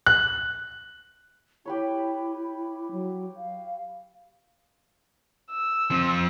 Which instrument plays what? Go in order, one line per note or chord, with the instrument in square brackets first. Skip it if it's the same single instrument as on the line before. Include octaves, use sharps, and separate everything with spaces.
[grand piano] F#6
[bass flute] E4 [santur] G4 B4 C#5
[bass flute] F#3
F5
[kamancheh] E6
[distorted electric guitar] F2 F3